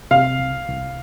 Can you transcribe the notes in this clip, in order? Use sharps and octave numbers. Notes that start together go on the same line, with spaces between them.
C3 F5
C2
C2